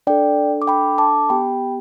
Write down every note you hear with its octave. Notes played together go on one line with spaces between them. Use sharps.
D4 A4 D5 G5
D6
G5 B5
A5 D6
B3 G4 G5 B5